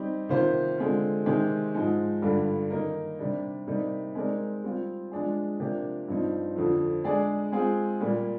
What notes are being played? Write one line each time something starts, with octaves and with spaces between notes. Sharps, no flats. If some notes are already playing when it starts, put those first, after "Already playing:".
Already playing: G3 C4 D#4 G4
C3 D#3 A#3 F4 C5
D3 G#3 C4 F4
C3 D#3 G#3 C4 G4
G#2 F3 G#3 D#4
G2 D3 G3 D4 F4
D#3 A#3 D#4 A#4
C3 G3 D4
C3 G3 A#3 D#4
G#3 C4 D#4 A#4 D5
G3 C4 F4
F3 G#3 D4 G#4
C3 F3 A#3 D4 G4
G2 F3 C4 D#4
F2 D3 F3
G#3 D4 G#4 D5
G#3 C4 F4 G#4
A#2 G3 A#3